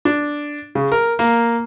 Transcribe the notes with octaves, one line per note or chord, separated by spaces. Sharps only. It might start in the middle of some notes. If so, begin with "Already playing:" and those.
D4
C#3
A#4
A#3